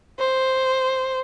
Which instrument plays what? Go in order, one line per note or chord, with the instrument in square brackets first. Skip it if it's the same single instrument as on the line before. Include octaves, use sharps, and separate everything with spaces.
[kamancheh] C5